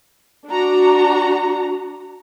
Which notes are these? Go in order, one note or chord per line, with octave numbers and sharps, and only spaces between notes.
D4 F#4 A#5